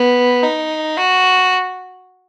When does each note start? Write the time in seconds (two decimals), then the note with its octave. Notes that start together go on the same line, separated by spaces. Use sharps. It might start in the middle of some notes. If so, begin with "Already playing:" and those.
Already playing: B3
0.43 D#4
0.97 F#4